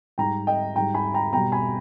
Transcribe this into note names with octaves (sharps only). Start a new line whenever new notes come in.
G#2 G3 G5 A#5
D#5 G5
G#2 G3 G5 A#5
G#5 B5
G5 A#5
B2 G3 G5 A#5
G#5 B5